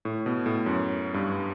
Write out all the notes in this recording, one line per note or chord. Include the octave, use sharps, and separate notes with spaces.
A2
B2
A2
F#2
G2